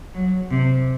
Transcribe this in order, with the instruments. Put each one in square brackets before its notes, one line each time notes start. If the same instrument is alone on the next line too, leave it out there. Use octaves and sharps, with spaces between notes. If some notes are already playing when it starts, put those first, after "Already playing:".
[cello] F#3
C3